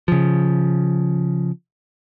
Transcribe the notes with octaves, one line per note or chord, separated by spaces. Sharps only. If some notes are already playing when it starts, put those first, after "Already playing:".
C#3 F3